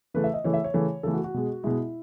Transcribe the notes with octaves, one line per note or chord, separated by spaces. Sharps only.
C#3 E3 A3 B4
E5
D#5
C#3 E3 A3 C#5
E5
C#5
C#3 E3 A3
C#3 E3 A3 A4
F#4
F#4
B2 G#3
B2 G#3 E4